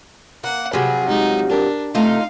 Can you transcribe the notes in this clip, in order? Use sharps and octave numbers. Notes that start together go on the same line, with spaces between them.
A#3 F#5
C3 F3 F#3 G#4 B4
G#3 D#4
D4 G4 A#4
C3 A3 D#4 F4 F5 A5